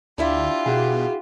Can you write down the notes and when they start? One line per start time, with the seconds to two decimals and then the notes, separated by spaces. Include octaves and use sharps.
0.18 D2 D4 E4 F4 G4 E5
0.66 B2 F#4 G#4